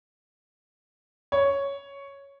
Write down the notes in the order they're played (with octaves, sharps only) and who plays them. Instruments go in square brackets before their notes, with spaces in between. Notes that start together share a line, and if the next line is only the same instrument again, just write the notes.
[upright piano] C#5